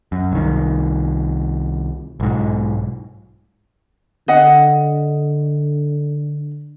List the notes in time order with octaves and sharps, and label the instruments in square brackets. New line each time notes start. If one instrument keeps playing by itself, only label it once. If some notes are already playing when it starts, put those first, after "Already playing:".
[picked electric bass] F#2
C2 D#3
B1 G#2
[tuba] D3 [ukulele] D#5 F#5